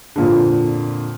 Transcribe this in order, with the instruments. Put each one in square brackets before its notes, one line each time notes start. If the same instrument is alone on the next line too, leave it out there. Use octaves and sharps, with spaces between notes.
[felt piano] F2 A#2 D3